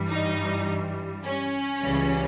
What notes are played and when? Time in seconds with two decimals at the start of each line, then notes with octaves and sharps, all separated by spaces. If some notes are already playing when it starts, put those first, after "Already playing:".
Already playing: G2 E3 G3
0.09 D#4
1.24 C#4
1.82 C#2 C#3 E3 G3